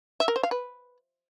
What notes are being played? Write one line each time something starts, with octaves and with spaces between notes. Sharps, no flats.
E5
A#4
C5
F5
B4